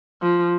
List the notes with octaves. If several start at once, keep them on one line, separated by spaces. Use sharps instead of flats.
F3